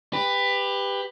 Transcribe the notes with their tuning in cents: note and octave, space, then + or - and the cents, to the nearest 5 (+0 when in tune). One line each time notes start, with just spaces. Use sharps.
G4 +20 B4 +10